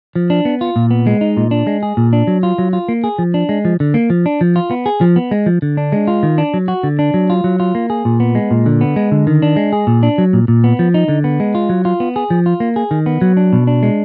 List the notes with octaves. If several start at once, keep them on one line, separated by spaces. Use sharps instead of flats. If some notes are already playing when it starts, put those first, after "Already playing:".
F3
D4
B3
F4
A#2
B3
G#3
D#4
A#2
D4
G#3
G#4
A#2
D4
F#3
F4
F#3
F4
A#3
G#4
F3
D4
G#3
F3
D3
A#3
F3
D4
F3
F4
B3
G#4
F3
B3
G#3
F3
D3
D4
G#3
F4
D#3
D4
F#3
F#4
D3
D4
F#3
F4
F#3
F4
A#3
G#4
A#2
B3
G#3
A#2
D3
B3
G#3
D3
D#3
D4
G#3
G#4
A#2
D4
F#3
A#2
A#2
B3
F3
D#4
D3
B3
G#3
F4
F#3
F4
B3
G#4
F3
F4
A#3
G#4
D#3
B3
F#3
D4
B2
D4
G#3